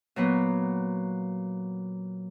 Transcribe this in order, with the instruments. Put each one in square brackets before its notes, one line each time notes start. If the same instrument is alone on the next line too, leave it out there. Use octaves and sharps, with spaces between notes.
[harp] A#2 F#3 B3